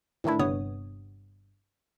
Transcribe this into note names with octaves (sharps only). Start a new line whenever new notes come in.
A2 D#3 E3 A3 D4 E4
G1 G2 C3 B3 C#5 D#6